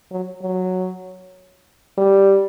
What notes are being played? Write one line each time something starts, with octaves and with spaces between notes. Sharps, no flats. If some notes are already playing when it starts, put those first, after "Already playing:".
F#3
F#3
G3